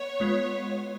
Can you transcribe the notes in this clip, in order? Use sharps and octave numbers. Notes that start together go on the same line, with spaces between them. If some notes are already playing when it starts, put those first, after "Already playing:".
Already playing: B3 C#5
G#3 B3 F4